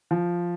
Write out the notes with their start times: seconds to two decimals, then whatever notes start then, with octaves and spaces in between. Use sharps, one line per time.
0.11 F3